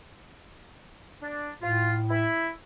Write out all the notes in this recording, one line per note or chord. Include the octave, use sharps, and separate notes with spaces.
D4
A2 F4
E4